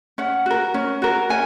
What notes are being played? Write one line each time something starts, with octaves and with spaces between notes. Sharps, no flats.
C#4 F#5
F#4 A#4
C#4
F#4 A#4
C#4 G#5